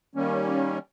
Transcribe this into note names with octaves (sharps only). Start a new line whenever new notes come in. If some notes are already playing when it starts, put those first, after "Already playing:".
D#3 G3 A#3 C#4